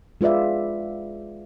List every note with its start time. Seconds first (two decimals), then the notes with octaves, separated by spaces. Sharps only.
0.21 G#3 F4 B4 D5 E5